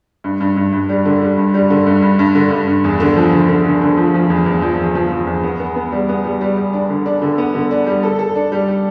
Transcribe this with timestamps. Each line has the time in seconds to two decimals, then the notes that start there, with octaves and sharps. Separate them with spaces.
0.24 G2
0.41 G2
0.57 G2
0.73 G2
0.89 G3
1.05 D3
1.22 G3
1.38 G2
1.54 G3
1.70 D3
1.87 G2
2.02 G2
2.19 G2
2.35 D3
2.51 G2
2.67 G2
2.84 E2
3.00 D3
3.16 F3
3.33 D3
3.48 D3
3.65 D3
3.81 D3
3.97 F3
4.14 F3
4.30 E2
4.46 E2
4.62 F3
4.79 E2
4.95 F3
5.11 F3
5.27 E2
5.43 B3
5.60 B3
5.76 B3
5.92 G3
6.09 B3
6.24 G3
6.41 G3
6.57 G3
6.73 D4
6.89 D3
7.06 D4
7.22 D3
7.38 B3
7.54 D3
7.71 D4
7.87 G3
8.03 A4
8.19 A4
8.35 D4
8.52 G3
8.68 G3